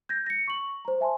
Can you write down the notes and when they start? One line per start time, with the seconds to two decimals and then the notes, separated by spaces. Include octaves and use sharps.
0.09 G6 G#6 A#6
0.26 A#6 C#7
0.48 C#6 F#7
0.85 C5 A#5
1.01 E5 G#5 A5 C6